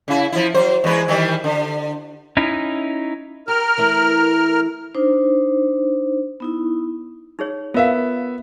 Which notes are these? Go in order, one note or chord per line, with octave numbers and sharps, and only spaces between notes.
C#3 E4
F3 E4
F#3 C5
E2 G#3 B4
D#3 E3 G3
D3
C#4 D#4 E4
G4 A#4 F6
E3 A3 E4
D4 D#4 C5
B3 D#4 E4
D#4 G#4 C#5
B3 F4 A#4 E5 F5